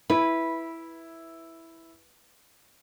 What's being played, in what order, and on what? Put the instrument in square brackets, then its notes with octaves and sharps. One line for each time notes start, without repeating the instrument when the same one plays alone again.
[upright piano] E4 [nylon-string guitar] B4